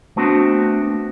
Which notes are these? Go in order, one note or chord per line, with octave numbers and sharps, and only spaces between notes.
A3 B3 C4 D4 F#4